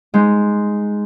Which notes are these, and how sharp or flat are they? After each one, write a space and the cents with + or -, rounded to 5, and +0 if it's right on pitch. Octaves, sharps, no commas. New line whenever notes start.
G#3 +0 D#4 +0